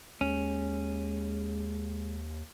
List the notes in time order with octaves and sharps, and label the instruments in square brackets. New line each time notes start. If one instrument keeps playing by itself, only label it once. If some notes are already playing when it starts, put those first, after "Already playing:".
[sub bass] D#2 [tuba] G#3 [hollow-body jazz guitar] C#4